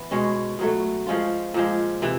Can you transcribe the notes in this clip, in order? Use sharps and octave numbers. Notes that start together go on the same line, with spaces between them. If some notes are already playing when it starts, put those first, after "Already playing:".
Already playing: E3 B3
B2 G#3 C#4
B2 F#3 A3
F3 G#3 C#4 F4
A#2 F3 G#3
C3 E3